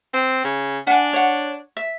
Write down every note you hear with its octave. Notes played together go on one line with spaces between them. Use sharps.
C4
C#3
D4 F#5 G#5
C#5 F#5
E5